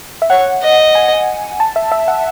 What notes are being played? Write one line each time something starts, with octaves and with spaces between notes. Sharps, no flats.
E5
C#5 F#5
D#5
G#5
A5
E5
E5
F#5